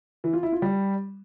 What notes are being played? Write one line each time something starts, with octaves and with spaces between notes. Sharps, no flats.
E3
F4
E4
F4
G3